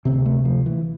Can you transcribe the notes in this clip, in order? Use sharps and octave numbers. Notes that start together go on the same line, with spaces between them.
D2 C3 C4
A3
F3
E3